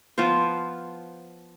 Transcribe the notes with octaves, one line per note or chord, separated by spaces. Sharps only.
F3 B3 F4 C5